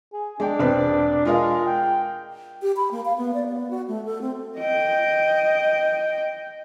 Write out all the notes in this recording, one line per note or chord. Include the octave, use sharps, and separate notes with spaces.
G#4
G#3 D4 G5
E1 C4 B4
G#3 F4 A#4 F5
G5
G4
B5
A#3
F5
B3
D5
B3
F#4
A3
A4
C4
D#5 G5